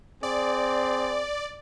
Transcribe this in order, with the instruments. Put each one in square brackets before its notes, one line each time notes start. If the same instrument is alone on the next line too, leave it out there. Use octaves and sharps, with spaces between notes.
[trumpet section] C4 G#4 [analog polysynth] D5